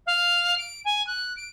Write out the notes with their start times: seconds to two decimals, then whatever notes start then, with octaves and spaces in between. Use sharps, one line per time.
0.06 F5
0.57 D7
0.85 G#5
1.07 F#6
1.36 D7